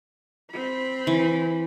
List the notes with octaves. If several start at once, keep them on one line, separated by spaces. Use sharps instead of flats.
C4 B5
E3